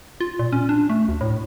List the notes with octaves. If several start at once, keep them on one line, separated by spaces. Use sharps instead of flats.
F4
A#2
C#4
D4
A3
D2
A2